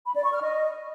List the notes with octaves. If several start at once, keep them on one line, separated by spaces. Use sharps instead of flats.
B5
D5
C#6
F6
D#5